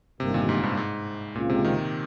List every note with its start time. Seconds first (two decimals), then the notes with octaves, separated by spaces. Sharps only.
0.19 G1 G2 C3 D#3 G3 A#3
0.34 A#2
0.49 G#2
0.63 G2
0.77 G#2
1.35 C#2 A#2 C#3 G#3 C4 F4
1.50 C3
1.64 D#3